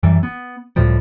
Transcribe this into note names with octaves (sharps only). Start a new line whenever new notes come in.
F#2 E3 G3
B3
C#2 A2 F3 G3